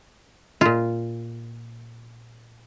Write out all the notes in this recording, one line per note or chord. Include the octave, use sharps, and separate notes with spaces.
A#2 F4